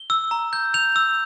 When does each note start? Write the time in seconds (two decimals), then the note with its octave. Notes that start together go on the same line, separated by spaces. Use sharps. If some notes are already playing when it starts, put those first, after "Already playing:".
Already playing: G7
0.10 E6
0.31 A#5
0.53 G6
0.74 G6 F7
0.96 E6